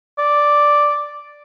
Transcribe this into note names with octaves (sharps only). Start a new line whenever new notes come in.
D5